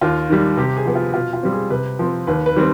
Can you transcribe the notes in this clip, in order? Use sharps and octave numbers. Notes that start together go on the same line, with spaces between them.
D#2 F4
D#3 G3
C3 G4
G#4
F3 B3
F4
B2 F4
F4
G3 C4
G#4
C3 B4
F3 C4
D#2 B4
B4
D#3 G3 C4